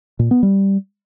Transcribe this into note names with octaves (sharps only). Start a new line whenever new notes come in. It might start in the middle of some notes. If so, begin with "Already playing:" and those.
A#2
B3
G3